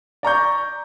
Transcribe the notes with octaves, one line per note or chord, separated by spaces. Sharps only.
D5 A#5 C#6 G6